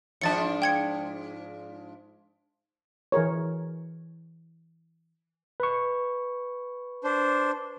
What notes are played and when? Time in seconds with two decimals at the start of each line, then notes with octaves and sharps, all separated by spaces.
0.21 G#2 F3 D4 A5 A6 C#7
0.62 G5 G#6 C#7
3.12 E3 G#4 A#4 C#5
5.60 B4 C#6
7.04 D4 C5